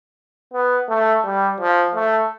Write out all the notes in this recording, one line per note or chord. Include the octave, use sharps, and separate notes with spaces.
B3
A3
G3
F3
A3